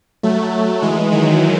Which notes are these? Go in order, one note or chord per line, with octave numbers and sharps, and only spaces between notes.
F#3 A3
E3 G#3
D#3 F#3